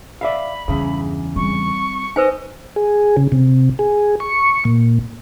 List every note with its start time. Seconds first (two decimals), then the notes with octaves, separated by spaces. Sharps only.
0.21 D5 E5 F5 B5
0.68 E2 G2 C#3
1.36 G3 C4 C#6
2.16 D#4 B4 C5 D#5 G#5
2.76 G#4
3.17 C#3
3.32 C3
3.79 G#4
4.20 C#6
4.65 A#2